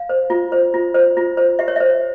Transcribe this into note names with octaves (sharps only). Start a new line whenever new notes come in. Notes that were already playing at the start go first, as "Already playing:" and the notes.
Already playing: F5
C5
F4
C5
F4
C5
F4
C5
G4 E5
C#5
C5 E5